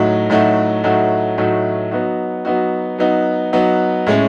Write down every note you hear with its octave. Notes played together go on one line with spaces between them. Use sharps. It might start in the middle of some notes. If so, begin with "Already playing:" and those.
Already playing: A2 F#3 A3 D#4 F#4
A2 F#3 A3 D#4 F#4
A2 F#3 A3 D#4 F#4
A2 F#3 A3 D#4 F#4
F#3 B3 D#4 F#4
F#3 B3 D#4 F#4
F#3 B3 D#4 F#4
F#3 B3 D#4 F#4
A2 G#3 C#4